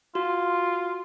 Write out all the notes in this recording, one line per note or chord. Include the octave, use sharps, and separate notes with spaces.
F4 F#4